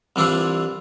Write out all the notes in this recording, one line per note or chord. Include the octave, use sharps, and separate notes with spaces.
C2 E3 D4 E4 F4